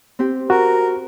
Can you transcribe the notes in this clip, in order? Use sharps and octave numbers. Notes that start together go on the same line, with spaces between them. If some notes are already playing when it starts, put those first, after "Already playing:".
C4 G4
F#4 A#4